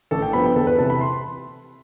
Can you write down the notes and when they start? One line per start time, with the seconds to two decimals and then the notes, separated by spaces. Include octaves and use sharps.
0.11 A1 A4
0.22 G5
0.33 G2 F3 B3 B5
0.44 G5
0.56 E2 A4
0.67 B4
0.78 C3 E3 A5
0.90 B5
1.01 C6